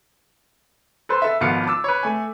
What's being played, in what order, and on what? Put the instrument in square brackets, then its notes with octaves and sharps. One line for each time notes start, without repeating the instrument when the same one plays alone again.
[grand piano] A4 B4 C5
A4 B4 E5
G#1 G#2 F3 B3 F5 C#7
A5 D6 E6
B4 C#5
A3 G#5